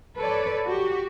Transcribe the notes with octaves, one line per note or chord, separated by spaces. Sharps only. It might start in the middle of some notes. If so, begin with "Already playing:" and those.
A4 B4 C#5 D5
F#4 G4